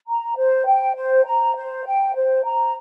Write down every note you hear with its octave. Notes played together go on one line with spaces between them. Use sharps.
A#5
C5
G5
C5
A#5
C5
G5
C5
A#5